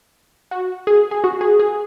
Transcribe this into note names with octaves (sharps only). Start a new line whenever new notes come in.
F#4
G#4
G#4
F#4
G#4
G#4